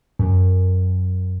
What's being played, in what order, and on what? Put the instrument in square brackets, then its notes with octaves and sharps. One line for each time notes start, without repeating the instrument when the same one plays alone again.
[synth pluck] F#2